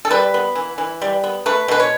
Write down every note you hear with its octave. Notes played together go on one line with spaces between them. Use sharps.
A4
G3 B4
B3
E3
E3
G3
B3
A3 B4
B2 B4
C#5